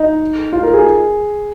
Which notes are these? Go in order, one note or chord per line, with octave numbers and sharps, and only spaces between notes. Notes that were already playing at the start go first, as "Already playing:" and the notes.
Already playing: D#4
F4
A#4
G#4